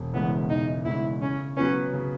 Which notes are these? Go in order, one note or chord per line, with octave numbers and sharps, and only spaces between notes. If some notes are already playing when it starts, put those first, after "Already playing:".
Already playing: E1
E2 C#3 E3 G#3 B3
E1 D#4
E2 C#3 E3 G#3 E4
C#3 C#4
F#3 B3 C#4 F#4 B4
C#3